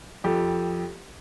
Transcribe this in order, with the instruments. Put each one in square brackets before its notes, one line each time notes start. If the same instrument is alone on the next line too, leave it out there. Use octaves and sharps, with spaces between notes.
[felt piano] F2 G4 A4